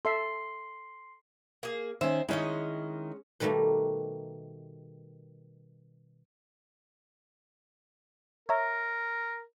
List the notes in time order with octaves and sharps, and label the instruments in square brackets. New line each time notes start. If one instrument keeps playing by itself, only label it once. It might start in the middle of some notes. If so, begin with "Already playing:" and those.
[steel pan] A4 E5 [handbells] C6 C7
[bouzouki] A#3 G#4
[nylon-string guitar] D#3 C#4 [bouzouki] C5 E5
[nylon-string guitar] D#3 D#4 E4 [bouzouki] G#3 C#4 D#5
[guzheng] B2 D#3 G3 A3 A#3
[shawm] A#4 [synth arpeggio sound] C#5 E5 A#5